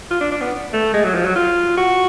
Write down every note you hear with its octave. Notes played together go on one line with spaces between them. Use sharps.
F4
D4
D4
B3
A3
G#3
F#3
F3
F#3
F4
F#4